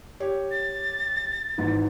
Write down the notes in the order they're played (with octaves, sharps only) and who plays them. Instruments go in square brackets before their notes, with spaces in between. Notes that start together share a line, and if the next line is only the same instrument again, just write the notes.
[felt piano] G4 C#5
[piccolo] A6
[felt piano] G#1 G#2 E3